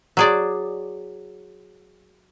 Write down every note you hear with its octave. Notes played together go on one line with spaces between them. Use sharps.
F#3 G#4 D5